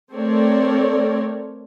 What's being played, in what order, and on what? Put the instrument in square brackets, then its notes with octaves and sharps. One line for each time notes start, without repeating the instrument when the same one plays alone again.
[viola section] A3 C4 A4 A#4 C#5 D5